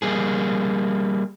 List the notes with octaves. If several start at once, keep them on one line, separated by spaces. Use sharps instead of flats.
G3 A#3 G#4